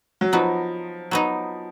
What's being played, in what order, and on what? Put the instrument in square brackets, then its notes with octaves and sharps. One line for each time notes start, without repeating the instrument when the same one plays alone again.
[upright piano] F#3
[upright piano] F3 [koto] F#3 B3 D#4
[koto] F#3 B3 D#4